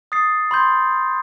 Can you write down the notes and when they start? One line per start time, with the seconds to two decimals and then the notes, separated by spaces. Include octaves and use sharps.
0.12 D#6 A6 C7
0.51 B5 C6 G6